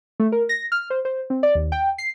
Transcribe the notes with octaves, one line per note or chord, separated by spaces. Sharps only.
A3
A#4
A#6
F6
C5
C5
C4
D5
D#2
G5
C7